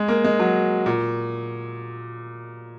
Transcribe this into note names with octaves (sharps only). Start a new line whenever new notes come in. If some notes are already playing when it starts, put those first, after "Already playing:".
Already playing: G#3
A#3
G#3
F#3
A#2